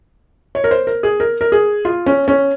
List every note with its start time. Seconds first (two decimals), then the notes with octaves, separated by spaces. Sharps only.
0.55 C#5
0.64 A#4
0.71 C5
0.87 A#4
1.03 G#4
1.20 A#4
1.41 A#4
1.52 G#4
1.85 F4
2.06 C#4
2.28 C#4